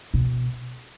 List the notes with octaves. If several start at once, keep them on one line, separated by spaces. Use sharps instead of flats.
B2